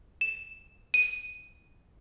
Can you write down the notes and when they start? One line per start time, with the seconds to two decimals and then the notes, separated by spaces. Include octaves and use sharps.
0.21 E7
0.94 D#7